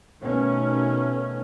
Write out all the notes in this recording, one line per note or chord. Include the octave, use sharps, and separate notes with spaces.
B2 D#3 A3 C#4